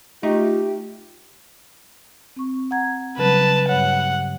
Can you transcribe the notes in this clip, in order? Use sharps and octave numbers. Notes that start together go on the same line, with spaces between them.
A3 D#4 F4 G4
C4 C#6
F#5 A#5 G#6
C#3 F#3 G3 B4 A5
G2 G3 C#5 F#5